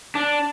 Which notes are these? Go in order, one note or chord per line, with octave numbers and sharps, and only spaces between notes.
D4